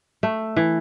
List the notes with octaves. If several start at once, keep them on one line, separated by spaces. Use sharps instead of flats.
A3
E3